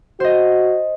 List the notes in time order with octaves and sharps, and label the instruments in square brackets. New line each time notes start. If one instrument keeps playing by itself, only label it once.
[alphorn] F#4 [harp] C5 D#5